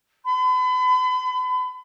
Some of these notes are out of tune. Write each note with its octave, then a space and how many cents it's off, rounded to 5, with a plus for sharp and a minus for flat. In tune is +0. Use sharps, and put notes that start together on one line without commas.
B5 +40